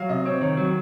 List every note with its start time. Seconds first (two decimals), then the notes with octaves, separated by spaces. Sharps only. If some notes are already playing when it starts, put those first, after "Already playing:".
Already playing: F#3 F5
0.09 C3 D#5
0.25 C4 C#5
0.41 D#3 C#5
0.57 F#3